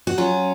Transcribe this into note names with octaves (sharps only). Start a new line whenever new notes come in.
F#4
F#3 C#4 F4